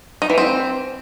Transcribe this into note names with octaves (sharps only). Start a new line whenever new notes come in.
D#4
E3
C4